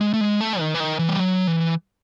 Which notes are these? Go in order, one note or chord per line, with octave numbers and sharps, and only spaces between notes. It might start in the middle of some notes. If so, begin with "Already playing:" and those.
G#3
A3
G#3
A3
D#3
E3
D#3
E3
G3
F#3
E3